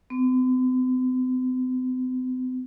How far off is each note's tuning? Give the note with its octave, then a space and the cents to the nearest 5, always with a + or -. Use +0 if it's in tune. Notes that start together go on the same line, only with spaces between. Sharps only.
C4 -45